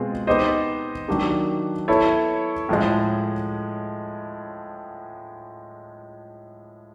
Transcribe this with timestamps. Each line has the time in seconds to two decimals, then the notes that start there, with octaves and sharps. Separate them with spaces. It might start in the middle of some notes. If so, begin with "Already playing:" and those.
Already playing: B2 G#3 C4 F4 G#4
0.27 B3 D#4 G4 C5 D#5
1.08 D#3 F#3 A#3 D4 G4
1.88 B3 E4 A4 C#5
2.69 A2 F3 G#3